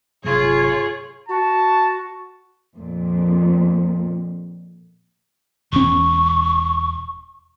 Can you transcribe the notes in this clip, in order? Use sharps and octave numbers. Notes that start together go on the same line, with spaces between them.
G1 C3 F#3 F4 G#4 C#5
F#4 A5
F2 A#2
E1 C#4 C#6